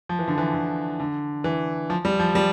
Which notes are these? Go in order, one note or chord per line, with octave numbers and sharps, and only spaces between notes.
F3
E3
D3
E3
D3
D3
E3
F3
G3
F3
G3